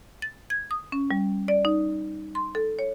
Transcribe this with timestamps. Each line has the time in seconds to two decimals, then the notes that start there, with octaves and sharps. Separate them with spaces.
0.22 A6
0.50 G#6
0.71 D#6
0.92 C#4
1.11 G3
1.48 D5
1.65 D#4
2.35 C6
2.55 A4
2.79 C#5